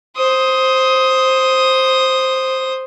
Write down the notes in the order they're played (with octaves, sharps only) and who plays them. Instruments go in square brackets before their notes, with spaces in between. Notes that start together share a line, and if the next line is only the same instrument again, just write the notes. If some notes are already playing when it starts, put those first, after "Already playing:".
[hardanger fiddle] C5 D#6